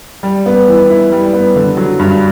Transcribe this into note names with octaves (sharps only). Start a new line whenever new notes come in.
G3
B3
E3
E4
G3
B3
D3
F#3
G2